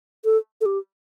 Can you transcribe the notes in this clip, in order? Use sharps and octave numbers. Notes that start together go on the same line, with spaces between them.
A4
A4
G4